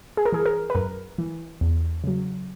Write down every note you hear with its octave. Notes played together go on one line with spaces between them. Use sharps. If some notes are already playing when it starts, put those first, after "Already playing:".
G#4
A#4
E3 G#4
A#4
B4
F#2 A#4
E3
E2
C#3 F#3